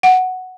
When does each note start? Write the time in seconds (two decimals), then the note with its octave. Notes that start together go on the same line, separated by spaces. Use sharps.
0.03 F#5